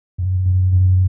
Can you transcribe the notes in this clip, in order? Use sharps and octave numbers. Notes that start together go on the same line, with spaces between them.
F#2
F#2
F#2